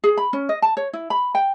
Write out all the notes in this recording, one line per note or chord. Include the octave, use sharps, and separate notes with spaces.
G#4
B5
C#4
D#5
A5
C#5
E4
B5
G5